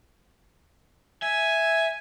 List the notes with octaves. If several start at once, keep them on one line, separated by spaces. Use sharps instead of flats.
E5 G#5